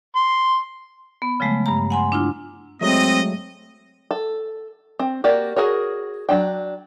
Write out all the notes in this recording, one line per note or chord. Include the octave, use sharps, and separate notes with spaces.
C6
B3
C#3 F3 F#3 G#3 A3
G2 A#5
F#5 G#5 C6
D4 E4 F4
F#3 G#3 A3 C4 D#5
A4
C4
A#3 F#4 G4 D5
F#4 G#4 A#4 C#5
F#3 D4 G5